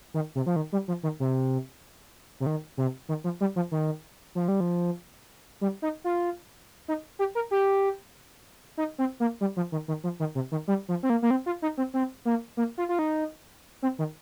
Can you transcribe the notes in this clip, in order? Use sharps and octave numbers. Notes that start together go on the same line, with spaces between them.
D#3
C3
F3
D#3
G3
F3
D#3
C3
C3
D#3
C3
D#3
F3
G3
F3
D#3
F3
G3
F3
G3
D#4
F4
D#4
G4
A#4
G4
D#4
C4
A#3
G3
F3
D#3
D#3
F3
D#3
C3
D#3
G3
F3
C4
A#3
A#3
C4
F4
D#4
C4
C4
A#3
A#3
F4
F4
D#4
C4
D#3